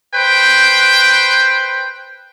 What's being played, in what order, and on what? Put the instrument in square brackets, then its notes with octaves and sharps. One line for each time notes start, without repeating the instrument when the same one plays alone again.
[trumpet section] B4 C5 G5